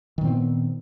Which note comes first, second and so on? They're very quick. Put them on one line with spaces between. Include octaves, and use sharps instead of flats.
D#3 A#2 C4 B3